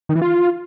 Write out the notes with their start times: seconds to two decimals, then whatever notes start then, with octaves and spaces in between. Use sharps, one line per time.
0.09 D#3
0.15 E3
0.22 F4